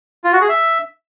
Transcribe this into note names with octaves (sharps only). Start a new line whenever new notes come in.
F4
F#4
G#4
E5